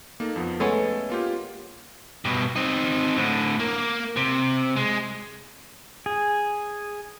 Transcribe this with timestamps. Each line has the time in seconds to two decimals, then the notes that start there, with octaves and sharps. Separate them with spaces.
0.20 A#3 D#4 A4
0.36 F2 F3 B3
0.60 G#3 A3 B3 C#4 A4
1.10 A#3 F4 G4
2.25 G2 B2
2.56 C4 D#4
3.16 A2 D3
3.60 A#3
4.17 C3
4.76 G#3
6.06 G#4